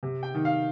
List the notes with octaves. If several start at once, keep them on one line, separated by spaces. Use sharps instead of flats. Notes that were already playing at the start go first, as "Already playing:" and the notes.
C3
G5
D#3
F5